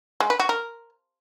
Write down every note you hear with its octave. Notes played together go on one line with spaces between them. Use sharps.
G#3
B4
F#4
A#4